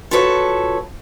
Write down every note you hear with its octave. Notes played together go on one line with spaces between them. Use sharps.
F4 F#4 A4 B4 C#5